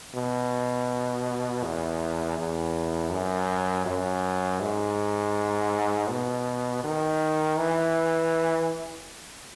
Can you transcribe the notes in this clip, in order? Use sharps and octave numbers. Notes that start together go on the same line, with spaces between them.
B2
E2
E2
F#2
F#2
G#2
B2
D#3
E3